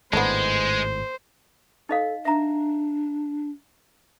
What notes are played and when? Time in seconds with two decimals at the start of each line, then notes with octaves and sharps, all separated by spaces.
0.13 G#1 A2 G#3 B3 D4 C5
1.89 D#4 A4 D#5 F5
2.25 D4 E5 A#5